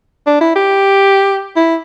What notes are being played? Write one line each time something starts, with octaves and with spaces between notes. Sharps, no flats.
D4
E4
G4
E4